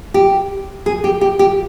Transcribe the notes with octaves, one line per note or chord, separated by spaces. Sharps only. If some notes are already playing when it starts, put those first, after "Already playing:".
G4
G#4
G4
G4
G4